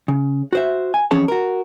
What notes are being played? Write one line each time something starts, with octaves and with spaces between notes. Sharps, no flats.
C#3
F#4 C5 E5
G#5
F2 E3 C#4 G#4 C#5 A5
F#4 A#4